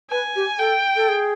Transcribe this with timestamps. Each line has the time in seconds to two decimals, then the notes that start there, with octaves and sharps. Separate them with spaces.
0.10 B4 G#5
0.36 G4
0.59 A4 G5
0.96 A4
1.09 G#4